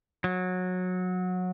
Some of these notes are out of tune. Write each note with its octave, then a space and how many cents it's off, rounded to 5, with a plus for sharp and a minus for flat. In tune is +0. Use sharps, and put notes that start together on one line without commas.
F#3 -20